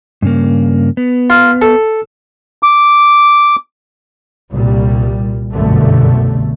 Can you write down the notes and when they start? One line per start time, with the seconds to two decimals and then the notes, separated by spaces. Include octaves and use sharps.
0.22 G2 C#3 A#3
0.97 B3
1.30 F4
1.62 A4
2.63 D6
4.54 C2 A#2 G3
5.53 G1 C2 F#2 B2 D3 A3